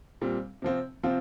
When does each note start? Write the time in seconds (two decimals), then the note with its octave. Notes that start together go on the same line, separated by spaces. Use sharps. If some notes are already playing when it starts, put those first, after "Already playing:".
0.21 A#2 G3 C4
0.62 C3 F3 C4 F4
1.03 C3 F3 C4 F4